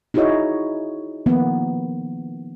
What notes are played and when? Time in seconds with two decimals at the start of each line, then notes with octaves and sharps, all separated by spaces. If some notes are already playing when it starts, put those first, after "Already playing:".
0.14 D#4 E4 F#4 G#4 C#5 D#5
1.26 D#3 F3 A#3 B3